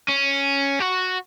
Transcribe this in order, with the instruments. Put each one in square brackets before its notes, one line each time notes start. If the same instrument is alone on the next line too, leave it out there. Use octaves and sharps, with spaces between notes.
[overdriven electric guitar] C#4
F#4